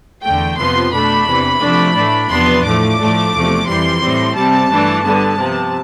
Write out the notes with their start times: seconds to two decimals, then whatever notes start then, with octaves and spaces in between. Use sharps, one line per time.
0.23 E2 D3 A3 G5
0.57 F2 C3 F3 B3 C6
0.92 B2 A3 D4 B5
1.27 E2 C3 E3
1.60 C3 F3 A3 D4
1.95 A2 E3 A3 D4
2.29 E2 C3 F3 B3 D4 C6
2.63 A2 F3 A3 D6
2.97 A2 F3 A3 D4
3.32 E2 C3 F3 A3
3.66 F2 E3 G3 C6
4.01 A2 G3 C4
4.35 C3 G3 C4 A5
4.69 G2 E3 A3 D4
5.04 D3 G3 B3 A5
5.38 C3 F3 B3